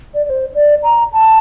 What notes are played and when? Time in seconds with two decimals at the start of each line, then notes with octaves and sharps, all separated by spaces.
0.14 D5
0.25 D5
0.29 C5
0.54 D5
0.83 A#5
1.13 A5